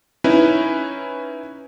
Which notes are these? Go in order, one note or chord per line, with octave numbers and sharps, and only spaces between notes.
C#4 D#4 E4 B4